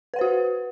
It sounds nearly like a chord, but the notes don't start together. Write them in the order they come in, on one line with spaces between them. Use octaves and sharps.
B4 F#5 C5 F#4